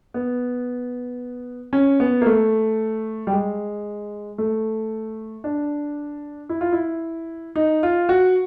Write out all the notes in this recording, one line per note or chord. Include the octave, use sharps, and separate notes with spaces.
B3
C#4
B3
A#3
A3
G3
G#3
A3
D4
E4
F4
E4
D#4
F4
F#4